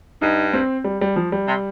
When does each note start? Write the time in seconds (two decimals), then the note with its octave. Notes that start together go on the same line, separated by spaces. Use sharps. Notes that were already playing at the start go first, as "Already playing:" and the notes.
0.22 G2 D#4
0.53 C4
0.84 G3
1.01 G3
1.16 F3
1.32 G3
1.48 C3